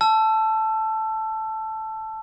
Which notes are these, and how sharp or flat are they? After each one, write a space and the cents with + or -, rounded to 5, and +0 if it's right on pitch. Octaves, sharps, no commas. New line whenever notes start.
A5 +0 E6 +25